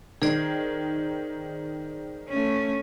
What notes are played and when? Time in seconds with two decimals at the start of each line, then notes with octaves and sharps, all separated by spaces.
0.22 D#3 G#4 C5 D5
2.29 A3 C#4